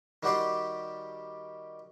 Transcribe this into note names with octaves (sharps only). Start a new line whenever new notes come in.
D#3 G3 F#4 G4 D5 C6